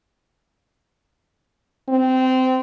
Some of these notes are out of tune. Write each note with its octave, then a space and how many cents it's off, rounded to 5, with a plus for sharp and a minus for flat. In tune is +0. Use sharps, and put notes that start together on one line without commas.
C4 -20